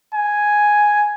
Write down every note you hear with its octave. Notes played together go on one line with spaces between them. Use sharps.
G#5